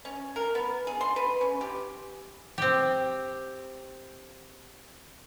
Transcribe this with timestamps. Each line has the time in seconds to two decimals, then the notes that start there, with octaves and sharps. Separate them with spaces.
0.05 C#4
0.36 A#4
0.55 B3
0.87 G#4
1.01 C6
1.16 B4
1.41 C#4
1.61 G4
2.58 C4 G4